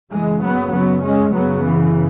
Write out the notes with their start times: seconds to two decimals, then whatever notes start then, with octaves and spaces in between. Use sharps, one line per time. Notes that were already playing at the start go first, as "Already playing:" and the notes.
0.11 F#2 C#3 E3 G#3
0.42 F#3 B3
0.73 F#3 B3
1.04 G#3 C#4
1.35 F#2 C#3 F#3 B3
1.66 E3